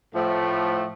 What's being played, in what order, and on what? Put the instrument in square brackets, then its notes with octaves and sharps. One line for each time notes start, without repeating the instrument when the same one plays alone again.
[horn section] A2 F3 A3